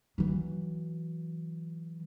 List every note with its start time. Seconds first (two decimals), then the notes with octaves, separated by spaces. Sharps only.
0.18 E3 F#3